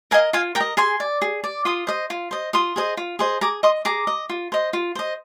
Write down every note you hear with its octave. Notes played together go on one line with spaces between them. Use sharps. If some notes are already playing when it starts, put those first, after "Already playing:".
A#4 D#5 F5 G#5
F4 F5 G#5
A#4 G5 A#5
D#5
G#4 G#5 C6
D5
G#4
D5
F4 C6 D#6
C5 D#5
F4
C5 D#5
F4 C6 D#6
G#4 C5 D#5
F4
G#4 C5 D#5
G#4 A#5 D6
D#5 C6 D#6
G#4 A#5 D6
D#5
F4
C5 D#5
F4
C5 D#5